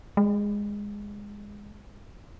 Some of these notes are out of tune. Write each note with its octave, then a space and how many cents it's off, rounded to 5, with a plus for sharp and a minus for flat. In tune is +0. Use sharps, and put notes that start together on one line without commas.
G#3 -15